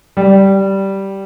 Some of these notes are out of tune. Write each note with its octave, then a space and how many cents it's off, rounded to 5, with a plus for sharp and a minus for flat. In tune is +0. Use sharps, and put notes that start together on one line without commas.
G3 -10